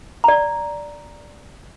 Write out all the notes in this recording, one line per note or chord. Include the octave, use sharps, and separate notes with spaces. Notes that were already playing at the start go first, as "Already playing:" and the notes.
D5 A#5